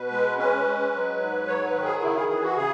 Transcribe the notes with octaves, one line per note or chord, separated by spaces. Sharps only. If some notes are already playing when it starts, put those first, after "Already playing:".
Already playing: B2 B4
G#3
C#4 B4
G#3
F#3
G#2
F#3 C#5
B4
D#3
G#4
C#3 E4
G#4
E3 G#4
F#4
C#3 G#4